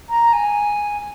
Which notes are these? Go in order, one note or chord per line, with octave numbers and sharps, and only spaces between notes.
A#5
G#5